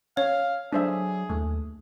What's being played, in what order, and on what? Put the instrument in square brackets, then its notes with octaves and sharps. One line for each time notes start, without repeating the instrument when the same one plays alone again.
[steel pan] C#4 [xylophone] C#5 [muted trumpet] F5
[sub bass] F#3 [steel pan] D4 C5 E5 [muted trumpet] G#4
[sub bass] D#2 [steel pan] A3